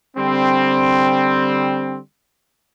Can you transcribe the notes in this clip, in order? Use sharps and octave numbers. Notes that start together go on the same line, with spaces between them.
D3 G3 C4